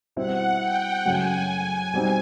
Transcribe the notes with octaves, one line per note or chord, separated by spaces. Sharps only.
B2 G3 C4 E4 F#5
G5
F#2 C#3 F#3 A3 C#4 G#5
B2 G3 C4 D#4